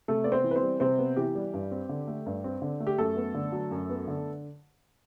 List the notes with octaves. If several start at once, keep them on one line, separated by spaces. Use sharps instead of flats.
C3 A3 A4
B3 D5
C4 C5
E3
B4
C4 C5
G3
C3 C4 C5
B3
E3 G4
G3
G2
C4
D3
A3
G2
C4
D3
A3
G4
F#2 A3 A4
B3
D3
F#3
F#2
B3
D3